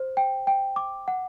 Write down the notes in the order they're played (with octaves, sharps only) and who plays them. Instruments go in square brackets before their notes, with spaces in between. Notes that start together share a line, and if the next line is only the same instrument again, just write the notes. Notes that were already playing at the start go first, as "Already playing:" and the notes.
Already playing: [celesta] C5
G5
G5
D6
F#5